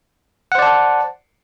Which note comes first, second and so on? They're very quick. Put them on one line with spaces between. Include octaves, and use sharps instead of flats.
F#5 C5 D5 A5